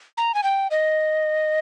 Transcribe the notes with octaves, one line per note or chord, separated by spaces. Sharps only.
A#5
G#5
G5
D#5